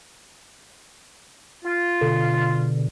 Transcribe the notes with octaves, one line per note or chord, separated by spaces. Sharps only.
F4
B2 D3